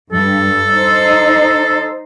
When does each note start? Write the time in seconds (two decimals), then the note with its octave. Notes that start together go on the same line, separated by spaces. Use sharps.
0.12 G2 A4
0.70 D#4 C5